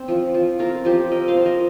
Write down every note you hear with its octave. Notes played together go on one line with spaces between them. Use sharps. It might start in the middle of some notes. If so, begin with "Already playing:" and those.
Already playing: C4
F3
F3
C4 F4 A#4
F3 G4 C5
C4 A#4 D#5
C5 F5
F3
A#4 D#5